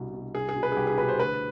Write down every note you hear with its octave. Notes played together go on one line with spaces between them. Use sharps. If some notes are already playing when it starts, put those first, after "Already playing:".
Already playing: C2 B2
B2
C2 G#4
G#4
B2
B4
G#4
C2 G4
G#4
B2 B4
C5
D2 B4